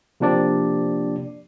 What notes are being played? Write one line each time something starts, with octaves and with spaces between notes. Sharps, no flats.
C3 F3 A#3 D4 G4 D5